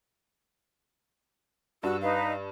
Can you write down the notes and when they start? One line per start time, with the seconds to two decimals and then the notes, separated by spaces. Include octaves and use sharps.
1.83 G2 F#4 E6
2.01 D#4 B4 F5